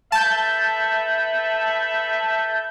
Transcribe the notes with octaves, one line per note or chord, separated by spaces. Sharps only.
A4 B4 E5 A5 G6